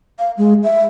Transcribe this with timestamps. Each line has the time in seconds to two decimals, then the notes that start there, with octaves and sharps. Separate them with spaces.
0.19 F5
0.37 G#3
0.64 E5